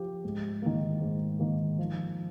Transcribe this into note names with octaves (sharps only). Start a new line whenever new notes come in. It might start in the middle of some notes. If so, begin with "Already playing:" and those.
Already playing: F3 G4
G#2
D#3 A#3
G#2
D#3 A#3
F3